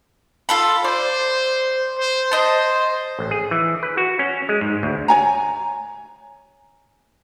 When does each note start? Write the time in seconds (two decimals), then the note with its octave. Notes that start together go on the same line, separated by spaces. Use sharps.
0.49 F4 A4 B5
0.84 C5 D5
1.99 C5
2.32 C5 D#5 A5
3.19 A1
3.31 G#4
3.51 E3
3.83 B4
3.97 F#4
4.19 C#4
4.49 G#3
4.61 G#2
4.83 D2
5.08 C#5 G#5 A#5